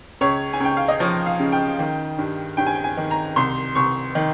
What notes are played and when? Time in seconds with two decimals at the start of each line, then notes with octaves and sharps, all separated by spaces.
0.21 C#2 C#5
0.53 G#5
0.60 C#2 G5
0.77 F5
0.88 D#5
1.00 F3 C#5
1.26 F5
1.39 C#3
1.52 G5
1.79 D#3
2.18 G2
2.57 G2 G5
2.66 G#5
2.75 G5
2.84 G#5
2.97 D#3
3.11 A#5
3.36 C2 C6
3.75 C2 C#6
4.15 D#3